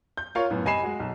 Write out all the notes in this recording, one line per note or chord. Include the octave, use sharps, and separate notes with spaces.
G6
F4 A#4 C#5 F5 C#6
F#2 A2 B3
C3 D#5 G#5 B5 C7 E7
G#3 F#4
B1